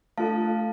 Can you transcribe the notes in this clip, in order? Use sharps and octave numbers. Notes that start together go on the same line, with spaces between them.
A3 D4 F4 A4 F5 A5